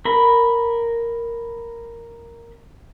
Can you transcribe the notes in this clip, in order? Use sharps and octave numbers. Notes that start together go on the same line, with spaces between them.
A#4 B5